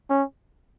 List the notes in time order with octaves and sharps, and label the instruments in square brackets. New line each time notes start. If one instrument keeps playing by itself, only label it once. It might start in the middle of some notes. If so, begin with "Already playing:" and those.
[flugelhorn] C#4